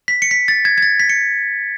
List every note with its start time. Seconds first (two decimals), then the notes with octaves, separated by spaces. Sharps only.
0.08 B6
0.22 C#7
0.31 B6
0.48 A6
0.65 G#6
0.78 G#6
0.82 A6
1.00 B6
1.09 C#7